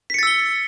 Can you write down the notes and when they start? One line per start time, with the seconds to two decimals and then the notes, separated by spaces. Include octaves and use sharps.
0.10 B6
0.14 C#7
0.19 A6
0.23 E6
0.27 G7